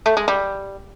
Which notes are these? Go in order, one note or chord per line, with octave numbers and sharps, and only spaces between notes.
A3
G#3
G3